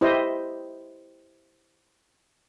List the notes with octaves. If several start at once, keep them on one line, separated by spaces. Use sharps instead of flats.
E4 G4 C5 D#5